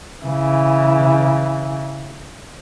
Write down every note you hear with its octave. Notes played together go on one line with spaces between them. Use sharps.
C#3 E3